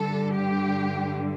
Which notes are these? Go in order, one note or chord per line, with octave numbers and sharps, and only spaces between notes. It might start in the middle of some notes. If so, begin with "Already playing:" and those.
Already playing: G2 D3 A4
G4